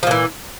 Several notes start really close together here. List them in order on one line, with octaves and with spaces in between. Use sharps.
F3 A#2 E3